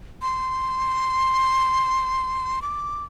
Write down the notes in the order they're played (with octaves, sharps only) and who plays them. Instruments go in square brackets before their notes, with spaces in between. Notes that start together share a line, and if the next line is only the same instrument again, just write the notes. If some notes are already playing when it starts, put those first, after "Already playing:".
[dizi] C6
D6